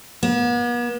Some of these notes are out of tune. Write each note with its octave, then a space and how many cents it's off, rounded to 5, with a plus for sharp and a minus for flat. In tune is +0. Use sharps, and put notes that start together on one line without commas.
B3 -45